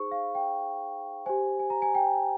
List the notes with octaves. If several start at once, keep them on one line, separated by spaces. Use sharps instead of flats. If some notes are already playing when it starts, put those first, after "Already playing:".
Already playing: D#4 G#4 C5 C#6
F5
G5
G4 C5 G#5
G#5
A#5
G#5
G5